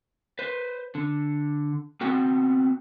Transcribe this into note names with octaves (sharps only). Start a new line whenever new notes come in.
B4 C5
D3
B3 C4 F#4 F#5 G5